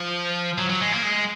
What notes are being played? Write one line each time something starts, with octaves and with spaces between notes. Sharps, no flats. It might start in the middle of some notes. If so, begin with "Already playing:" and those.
Already playing: F3
F#3
F#3
G#3
A#3
G#3